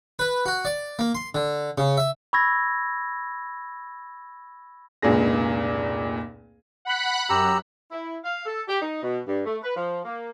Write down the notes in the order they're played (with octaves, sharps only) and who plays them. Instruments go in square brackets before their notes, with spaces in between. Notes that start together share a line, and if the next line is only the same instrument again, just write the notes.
[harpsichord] B4
F#4
D5
A#3
C6
D3
C#3
E5
[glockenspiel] B5 C#6 E6 G#6 A#6
[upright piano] F1 C#2 A#2 D4 G#4 A#6
[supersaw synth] F#5 B5 F#6
[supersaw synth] F#2 [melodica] G4 A#5 E6
[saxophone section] E4
F5
A4
G4
D#4
B2
G2
A3
B4
F3
A#3